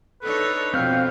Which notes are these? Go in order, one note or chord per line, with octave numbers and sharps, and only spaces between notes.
D4 D#4 A4 B4 C#5
F2 B2 C4 F5 G5 F6